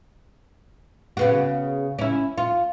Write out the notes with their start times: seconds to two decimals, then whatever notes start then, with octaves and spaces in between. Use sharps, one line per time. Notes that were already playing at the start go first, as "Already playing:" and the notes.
1.17 C#3 B3 F#4
1.99 C#4 E4
2.38 F4